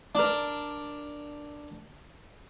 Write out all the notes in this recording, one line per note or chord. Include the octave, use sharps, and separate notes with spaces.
D4 A#4